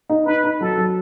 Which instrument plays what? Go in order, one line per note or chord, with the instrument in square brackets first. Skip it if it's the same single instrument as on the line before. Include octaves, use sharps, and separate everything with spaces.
[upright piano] D#4
[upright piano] D#4 [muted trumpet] B4
[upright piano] D#4
[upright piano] F#3 [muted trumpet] A4
[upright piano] F#3